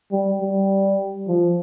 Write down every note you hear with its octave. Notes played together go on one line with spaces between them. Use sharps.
G3
G3
F3